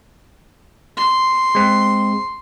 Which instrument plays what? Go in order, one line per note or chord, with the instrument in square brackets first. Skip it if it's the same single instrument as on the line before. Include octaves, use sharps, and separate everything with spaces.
[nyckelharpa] C6
[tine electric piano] G#3 C4